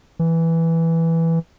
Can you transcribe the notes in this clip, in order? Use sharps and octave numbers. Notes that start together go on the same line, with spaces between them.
E3